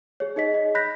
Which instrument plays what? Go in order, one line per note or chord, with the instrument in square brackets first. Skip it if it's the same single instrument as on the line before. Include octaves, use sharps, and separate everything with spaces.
[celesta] G#4 C#5
D#4 G#4 D#5 B6
D#5
B5 F#6 G6 A#6 B6